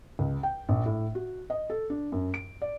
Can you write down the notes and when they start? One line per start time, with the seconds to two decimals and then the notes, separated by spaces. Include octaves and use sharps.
0.19 C#2
0.43 G5
0.69 A#1
0.86 A2
1.15 F#4
1.50 D#5
1.70 A4
1.90 D4
2.12 F#2
2.34 D7
2.62 D5